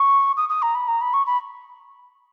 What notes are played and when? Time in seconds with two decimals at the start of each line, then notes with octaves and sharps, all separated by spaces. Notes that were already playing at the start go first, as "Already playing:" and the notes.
Already playing: C#6
0.37 D#6
0.49 D#6
0.62 A#5
0.75 B5
0.88 A#5
1.01 B5
1.14 C#6
1.26 B5